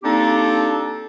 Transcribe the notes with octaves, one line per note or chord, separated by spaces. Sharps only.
A#3 C4 D4 D#4 G4 A4